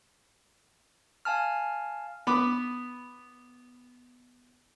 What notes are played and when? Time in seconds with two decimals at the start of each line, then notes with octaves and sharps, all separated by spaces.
1.25 F5 G#5 A5 F6
2.27 B3 B5 D6